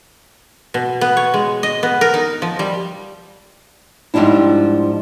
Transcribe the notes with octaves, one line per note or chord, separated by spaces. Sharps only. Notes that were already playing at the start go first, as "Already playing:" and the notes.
B2
B3
C#5
G#3
D#5
B3
A#4
D#4
F3
G3
G#2 F3 G3 D4 E4